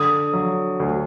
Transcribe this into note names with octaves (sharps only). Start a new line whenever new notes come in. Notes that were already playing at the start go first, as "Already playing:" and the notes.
Already playing: D3 D#6
F#3
D2